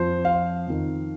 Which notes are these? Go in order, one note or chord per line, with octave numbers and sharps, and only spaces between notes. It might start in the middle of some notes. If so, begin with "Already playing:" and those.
Already playing: F2 F3 C5
F5
F2 D#3